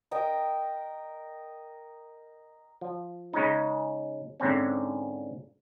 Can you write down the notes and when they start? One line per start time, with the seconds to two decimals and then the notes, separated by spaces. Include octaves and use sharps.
0.11 A#4 D#5 G5
2.81 F3
3.33 C#3 G#3 C#4 D#4
4.40 G#2 D3 C4 C#4